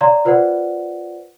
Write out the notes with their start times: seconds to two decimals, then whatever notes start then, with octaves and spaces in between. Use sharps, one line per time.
0.01 C#5 D5 F5 A#5 C6
0.25 F4 B4 C5 D5 F#5